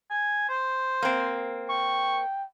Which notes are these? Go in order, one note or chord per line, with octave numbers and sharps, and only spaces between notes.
G#5
C5
A#3 C4
G5 C#6